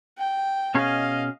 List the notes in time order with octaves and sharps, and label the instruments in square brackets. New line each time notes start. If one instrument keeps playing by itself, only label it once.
[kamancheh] G5
[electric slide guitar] B2 C#4 G#4 [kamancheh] D#5 F5